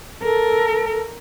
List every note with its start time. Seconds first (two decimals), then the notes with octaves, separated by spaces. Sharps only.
0.23 A4 A#4